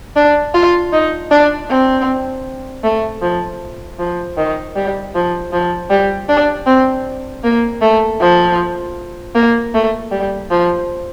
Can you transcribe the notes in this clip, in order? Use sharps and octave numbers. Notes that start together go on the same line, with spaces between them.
D4
F4
D#4
D4
C4
A3
F3
F3
D#3
G3
F3
F3
G3
D4
C4
A#3
A3
F3
A#3
A3
G3
F3